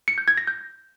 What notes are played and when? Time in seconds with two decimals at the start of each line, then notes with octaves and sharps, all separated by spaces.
0.08 C#7
0.18 G6
0.28 G#6
0.38 A#6
0.47 G6